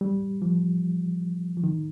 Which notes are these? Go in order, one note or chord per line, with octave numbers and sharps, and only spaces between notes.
G3
F3
F3
D#3